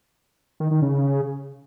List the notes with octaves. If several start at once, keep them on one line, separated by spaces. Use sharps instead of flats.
D#3
D#3
C#3